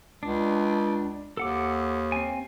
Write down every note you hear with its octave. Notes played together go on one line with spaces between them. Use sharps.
C#2 D4
D#2 A4 F#5 D6
C4 G#5